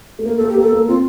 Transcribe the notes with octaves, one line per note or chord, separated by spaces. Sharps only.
A3
A#3 A#4
A#3 A4
G4
A#3 A4
A#3
C4 F4